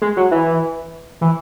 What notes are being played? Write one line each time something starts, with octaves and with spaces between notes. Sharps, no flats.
G#3
F#3
E3
E3